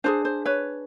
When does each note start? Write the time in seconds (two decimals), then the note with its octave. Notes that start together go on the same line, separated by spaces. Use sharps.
0.04 D4 F4 G#4 C5
0.25 C5
0.45 B4 C#5